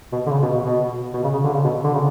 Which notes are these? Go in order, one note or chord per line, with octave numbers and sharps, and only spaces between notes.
B2
D3
C#3
B2
B2
B2
B2
C#3
C#3
D3
C#3
B2
D3
C#3